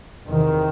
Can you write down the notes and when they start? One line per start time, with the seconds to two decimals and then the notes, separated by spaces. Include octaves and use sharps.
0.27 E2 C3 D#3